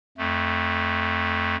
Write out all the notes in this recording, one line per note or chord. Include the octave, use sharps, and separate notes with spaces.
F2 A3